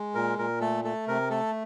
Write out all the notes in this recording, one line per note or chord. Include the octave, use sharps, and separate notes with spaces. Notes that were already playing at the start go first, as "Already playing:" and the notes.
Already playing: G#3
A#2 A#4
A#2 A#4
A3 A4
A3 A4
C3 A#4
A3 A4